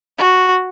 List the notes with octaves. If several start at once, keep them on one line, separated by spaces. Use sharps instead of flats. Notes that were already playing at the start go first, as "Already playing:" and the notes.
F#4